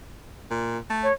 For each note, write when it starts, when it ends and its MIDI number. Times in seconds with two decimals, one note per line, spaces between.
0.51 0.78 46
0.90 1.08 57
1.03 1.13 73